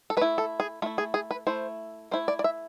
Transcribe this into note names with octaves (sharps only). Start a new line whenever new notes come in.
A4
A3 E4 B4
A4
G#4
A3 E4 F4
G#4
G#4
B4
A3 E4 C5
A3 E4 C5
D5
D5
E5